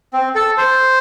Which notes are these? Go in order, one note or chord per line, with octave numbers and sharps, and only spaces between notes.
C4
A4
C5